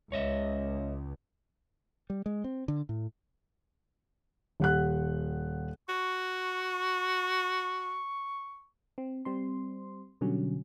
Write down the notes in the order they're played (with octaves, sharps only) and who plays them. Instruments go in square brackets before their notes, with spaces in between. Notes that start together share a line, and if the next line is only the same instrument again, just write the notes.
[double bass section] C#2 [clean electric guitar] C#5 D#5 E5
[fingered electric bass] G3
G#3
C4
D3
A2
[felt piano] D#1 F#5 F#6
[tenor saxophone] F#4 [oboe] C#6
[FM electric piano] C4
G3 C4 C6
B2 D3 F#3 G3 C#4